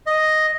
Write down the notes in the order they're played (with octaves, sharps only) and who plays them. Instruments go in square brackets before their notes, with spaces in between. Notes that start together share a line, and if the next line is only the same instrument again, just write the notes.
[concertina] D#5